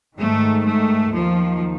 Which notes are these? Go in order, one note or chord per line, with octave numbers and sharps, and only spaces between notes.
G#2 D#3 A3
A3
D#2 D#3 F3